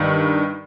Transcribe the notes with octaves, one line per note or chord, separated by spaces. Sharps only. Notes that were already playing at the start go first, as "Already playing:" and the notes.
Already playing: G2 D#3